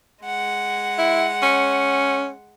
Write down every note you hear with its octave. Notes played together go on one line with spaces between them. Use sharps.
G#3 F#5
E4
C#4